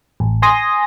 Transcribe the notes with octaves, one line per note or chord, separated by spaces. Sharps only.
A1
G#5 C6 D#6 A#6